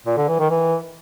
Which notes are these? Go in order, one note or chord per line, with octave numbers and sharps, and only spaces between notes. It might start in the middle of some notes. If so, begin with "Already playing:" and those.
A#2
D3
E3
D#3
E3